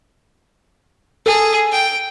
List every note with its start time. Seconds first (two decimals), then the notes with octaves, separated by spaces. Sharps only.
1.26 G#4 A4
1.72 G5